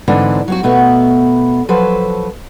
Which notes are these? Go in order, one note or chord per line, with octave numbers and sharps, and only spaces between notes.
G#2 D3 E3 C4 D4
F#3 C4 F#4
B2 A3 B3 F#4
F3 F#3 A4 B4 C5